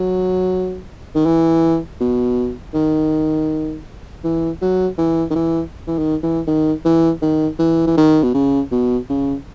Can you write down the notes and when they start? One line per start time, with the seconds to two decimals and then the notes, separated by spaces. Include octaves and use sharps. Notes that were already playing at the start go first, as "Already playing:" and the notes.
Already playing: F#3
1.15 D#3
1.26 E3
2.00 B2
2.74 D#3
4.24 E3
4.62 F#3
4.98 E3
5.31 D#3
5.35 E3
5.87 E3
5.98 D#3
6.23 E3
6.47 D#3
6.85 E3
7.22 D#3
7.59 E3
7.87 E3
7.98 D#3
8.23 B2
8.34 C#3
8.72 B2
9.09 C#3